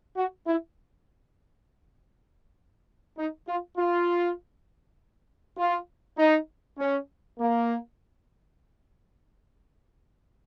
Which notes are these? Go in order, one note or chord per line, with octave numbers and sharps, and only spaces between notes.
F#4
E4
D#4
F4
F4
F4
D#4
C#4
A#3